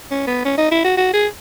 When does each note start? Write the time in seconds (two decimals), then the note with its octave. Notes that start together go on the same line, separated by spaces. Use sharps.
0.11 C#4
0.27 B3
0.45 C#4
0.58 D#4
0.71 E4
0.84 F#4
0.97 F#4
1.14 G#4